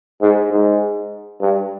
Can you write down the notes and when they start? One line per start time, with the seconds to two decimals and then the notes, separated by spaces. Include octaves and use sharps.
0.22 G#2
0.51 G#2
1.41 G2